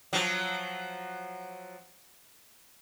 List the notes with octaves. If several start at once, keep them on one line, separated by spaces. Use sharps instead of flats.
F3 F#3